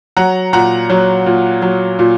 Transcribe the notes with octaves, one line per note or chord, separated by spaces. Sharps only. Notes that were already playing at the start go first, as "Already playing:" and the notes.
F#3 F#5 A#5
A#2 F#5 A#5
F#3
A#2
F#3
A#2